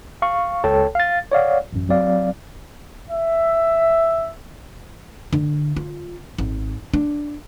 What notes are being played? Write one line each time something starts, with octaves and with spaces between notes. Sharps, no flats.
F5 C#6
C#2 A4 C#5 G5 A5
F5 A6
C#5 D5 F5 F#5
A1 F#2
F#3 C4 D5 F5
E5
D3
F4
G#1
D4